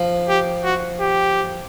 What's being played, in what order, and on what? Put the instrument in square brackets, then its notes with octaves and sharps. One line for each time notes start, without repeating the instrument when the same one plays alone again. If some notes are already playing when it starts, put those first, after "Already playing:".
Already playing: [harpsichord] F3
[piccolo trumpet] G4
F#4
G4